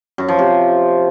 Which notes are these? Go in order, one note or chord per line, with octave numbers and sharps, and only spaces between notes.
F#2
F3
C3